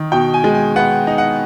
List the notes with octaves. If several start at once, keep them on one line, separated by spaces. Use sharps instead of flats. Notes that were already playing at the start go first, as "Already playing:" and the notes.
Already playing: D#3
B2 G5
G#5
G#3
G#5
B3 F#5
D#4
F#5